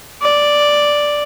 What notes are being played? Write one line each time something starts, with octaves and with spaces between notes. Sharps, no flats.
D5